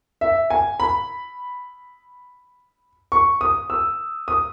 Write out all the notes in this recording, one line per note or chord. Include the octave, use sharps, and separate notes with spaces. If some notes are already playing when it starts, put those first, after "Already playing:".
E5
G#5
B5
C#6
D#6
E6
D#6